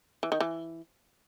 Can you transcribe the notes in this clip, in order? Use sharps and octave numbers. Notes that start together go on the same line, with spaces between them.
E3
D#3
E3